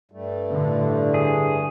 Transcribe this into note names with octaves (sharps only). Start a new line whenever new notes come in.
G2 G3 A3
A2 D3
G#4